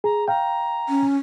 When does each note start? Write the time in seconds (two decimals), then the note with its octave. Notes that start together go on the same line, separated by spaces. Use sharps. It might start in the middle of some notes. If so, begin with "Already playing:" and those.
0.04 G#4 A#5
0.28 F5 G5 A#5
0.89 C#4